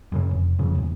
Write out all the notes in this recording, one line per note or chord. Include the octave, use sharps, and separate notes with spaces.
F#2 A2 C#3
F1
F1 F2 C#3
D#1 E2